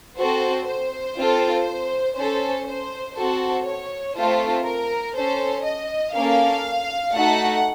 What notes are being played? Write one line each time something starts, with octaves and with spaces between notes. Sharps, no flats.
C4 F#4 A4 C5
C5
C4 F4 A4
C#4 A4 C5
C5
C4 F#4 A4 C5
C#5
A3 C4 F4 A4 C5
A#4
C#4 A4 C5
D#5
A#3 C#4 A4 F5
A3 D#4 F#4 A4 F#5